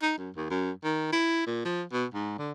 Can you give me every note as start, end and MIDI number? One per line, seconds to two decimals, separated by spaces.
0.02 0.15 63
0.18 0.30 42
0.36 0.46 39
0.50 0.71 42
0.84 1.10 51
1.12 1.46 64
1.46 1.64 46
1.65 1.82 53
1.92 2.06 47
2.14 2.37 44
2.38 2.52 50